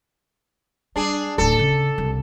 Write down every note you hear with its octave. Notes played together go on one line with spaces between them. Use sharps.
G3 D4 G#4
D1 A1 A4
C#3
C2